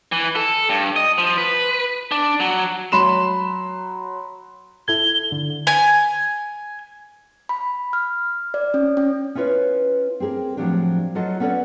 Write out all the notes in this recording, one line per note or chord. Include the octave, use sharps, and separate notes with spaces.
E3
A4
G2
D#5
F3
B4
D4
F#3
F#3 B5 C6 E7
E4 A4 G#6 G7
D3
G#5
B5
F6
D5
C#4
C#4
C#4 E4 F4 B4 C#5
C4 G4 G#4 A#4
A2 F3 F#3 C4 D4 G4
F#3 F4 F#4 A4 D#5
B3 C#4 A4 D5 F#5